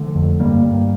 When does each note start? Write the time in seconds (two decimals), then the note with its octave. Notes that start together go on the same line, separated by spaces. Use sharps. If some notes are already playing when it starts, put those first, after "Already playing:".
Already playing: D3 F3 A3
0.16 F2
0.40 G2 G3 A#3
0.64 G2